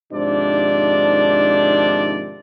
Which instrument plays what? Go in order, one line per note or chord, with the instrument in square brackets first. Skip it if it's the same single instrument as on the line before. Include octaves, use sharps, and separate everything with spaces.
[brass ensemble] G#2 C3 D#3 F3 D4 D5